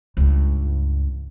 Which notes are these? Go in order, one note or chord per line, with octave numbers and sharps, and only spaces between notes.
C#2 G2